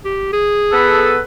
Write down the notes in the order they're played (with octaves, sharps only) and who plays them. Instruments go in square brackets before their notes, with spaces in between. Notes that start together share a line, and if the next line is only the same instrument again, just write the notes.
[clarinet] G4
G#4
[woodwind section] B3 A4 B4